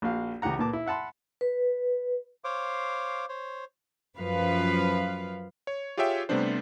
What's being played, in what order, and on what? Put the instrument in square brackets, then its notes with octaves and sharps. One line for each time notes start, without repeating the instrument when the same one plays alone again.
[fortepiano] A#1 F#4 F5
C#2 E3 G4 F#5 A#5
A#2 B3 A5 D6
E4
E5 F#5 A5 B5 C6
[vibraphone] B4
[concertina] C5 C#5 F5 D6
C5 C#5
[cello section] F#2 F3 B4 F5
[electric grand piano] C#5
F4 G4 G#4 C#5 E5 G5
C3 G3 A3 B3 D4 C5